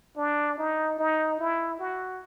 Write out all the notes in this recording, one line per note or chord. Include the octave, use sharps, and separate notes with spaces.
D4
D#4
D#4
E4
F#4